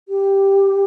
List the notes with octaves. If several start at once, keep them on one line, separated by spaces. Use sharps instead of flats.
G4